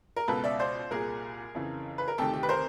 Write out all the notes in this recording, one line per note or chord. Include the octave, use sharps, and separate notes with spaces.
A#4
C#2 B2 A4 B4
D5 E5
C5 D5
C2 A#2 G#4 A#4
F2 C#3 E3
B4
A#4
D2 C3 D#3 G4 A4
G4
B4
A#4 C5